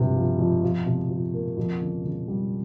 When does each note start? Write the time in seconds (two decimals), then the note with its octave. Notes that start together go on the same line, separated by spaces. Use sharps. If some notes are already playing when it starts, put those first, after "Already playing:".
Already playing: G2 C3 F3
0.16 F3
0.39 F2
0.63 F3
0.86 C3
1.10 F3
1.34 A#3
1.57 F2
1.81 C#3
2.04 C#3
2.28 G3